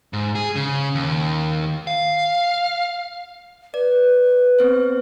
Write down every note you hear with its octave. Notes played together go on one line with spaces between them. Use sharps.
G#2
G#4
C#3
D#2
F5
B4 D5
B3 C4 C5